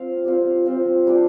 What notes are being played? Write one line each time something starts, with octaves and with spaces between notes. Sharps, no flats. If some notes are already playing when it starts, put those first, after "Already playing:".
Already playing: C4 F4 F5
G3 C4 F4
G3 C4 F4
G3 D4 F4